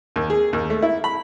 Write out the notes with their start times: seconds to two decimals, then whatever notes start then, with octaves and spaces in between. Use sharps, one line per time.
0.16 D#2
0.30 G#4
0.53 D#2
0.70 A3
0.83 E4
1.04 B5